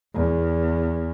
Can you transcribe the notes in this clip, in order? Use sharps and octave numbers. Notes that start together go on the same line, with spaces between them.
E2